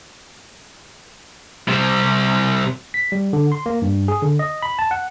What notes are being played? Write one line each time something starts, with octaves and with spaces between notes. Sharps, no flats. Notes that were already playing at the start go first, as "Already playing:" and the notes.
C3 G3
B6
G3
D3
C6
A#3
G2
G#4
D3
D#5
B5
A5
F#5